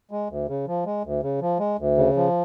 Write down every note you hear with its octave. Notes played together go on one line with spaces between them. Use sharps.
G#3
D2
C#3
F3
G#3
D2
C#3
F3
G#3
D2
C#3
F3